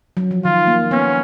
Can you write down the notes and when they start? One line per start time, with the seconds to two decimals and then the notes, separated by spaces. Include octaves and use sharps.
0.17 F#3
0.31 F3
0.44 D#3 F4
0.67 A#3
0.91 B3 C#4